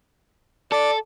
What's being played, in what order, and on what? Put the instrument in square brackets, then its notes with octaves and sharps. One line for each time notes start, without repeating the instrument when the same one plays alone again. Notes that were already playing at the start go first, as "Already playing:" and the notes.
[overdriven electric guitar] A4 [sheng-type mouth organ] D5